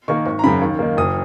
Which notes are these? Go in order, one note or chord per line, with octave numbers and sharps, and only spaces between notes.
D#3 A#3 C#6
G#1 C#6
A#5
F#2 C#3 B5
D#2
D#3 A#3
F#1 D#6